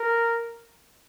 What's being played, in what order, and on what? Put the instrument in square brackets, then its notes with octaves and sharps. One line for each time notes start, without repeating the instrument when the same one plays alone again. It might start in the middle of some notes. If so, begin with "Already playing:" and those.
Already playing: [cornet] A#4